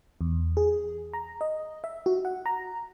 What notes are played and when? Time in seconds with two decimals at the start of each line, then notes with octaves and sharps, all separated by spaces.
0.21 E2
0.57 G#4
1.13 A#5
1.41 D#5
1.84 E5
2.06 F#4
2.25 F#5
2.46 A#5